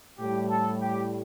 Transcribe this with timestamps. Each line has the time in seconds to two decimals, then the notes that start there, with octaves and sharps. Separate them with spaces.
0.19 A2 G3 G4
0.50 A4
0.81 G4